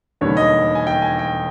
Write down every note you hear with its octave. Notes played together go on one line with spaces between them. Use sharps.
E1 D#2 D3 G3 C#5
D#5
G#5
G5
G#5
G5